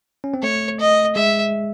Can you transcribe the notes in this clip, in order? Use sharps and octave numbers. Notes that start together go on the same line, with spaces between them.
C#4
C4
A3 C#5
D#5
G#3 E5